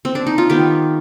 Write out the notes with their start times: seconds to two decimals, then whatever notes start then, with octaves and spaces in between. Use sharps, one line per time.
0.05 C4
0.15 D4
0.27 D#4
0.38 F4
0.50 D#3 B3 G4